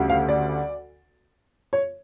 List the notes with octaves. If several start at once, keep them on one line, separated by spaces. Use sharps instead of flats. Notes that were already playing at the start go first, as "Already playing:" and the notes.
Already playing: D2 C#3 G3
F5
D5
C#5